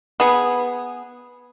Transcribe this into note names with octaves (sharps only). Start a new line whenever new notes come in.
B3 G#4